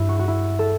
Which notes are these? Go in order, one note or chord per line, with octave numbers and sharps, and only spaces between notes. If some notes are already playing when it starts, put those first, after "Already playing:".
Already playing: G2 F#3 E4
F#4
F#4
E4
A4